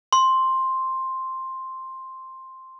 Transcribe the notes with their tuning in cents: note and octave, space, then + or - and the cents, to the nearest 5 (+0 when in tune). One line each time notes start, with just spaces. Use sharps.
C6 +5